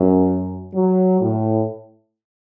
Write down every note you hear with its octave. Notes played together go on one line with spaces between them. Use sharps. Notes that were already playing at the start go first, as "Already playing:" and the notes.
Already playing: F#2
F#3
A2